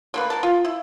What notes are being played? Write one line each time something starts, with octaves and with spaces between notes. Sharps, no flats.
D3 A#3 B4
A#4 A5
F4
E4